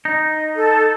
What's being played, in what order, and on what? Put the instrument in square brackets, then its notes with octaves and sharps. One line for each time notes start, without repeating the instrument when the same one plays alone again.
[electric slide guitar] D#4
[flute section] A4